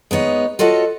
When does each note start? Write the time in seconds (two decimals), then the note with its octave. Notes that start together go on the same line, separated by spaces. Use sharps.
0.11 G#3 B3 D#4 C#5
0.59 F4 F#4 A4 C#5 D#5 F#5